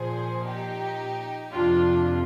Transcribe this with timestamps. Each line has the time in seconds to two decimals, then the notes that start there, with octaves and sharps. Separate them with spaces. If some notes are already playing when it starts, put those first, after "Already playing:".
Already playing: A#2 F3 G#4 C5
0.45 D#4 G4
1.54 F2 C3 F3 D4 F4